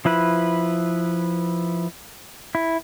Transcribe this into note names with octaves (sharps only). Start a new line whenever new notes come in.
F3 E4 B4
E4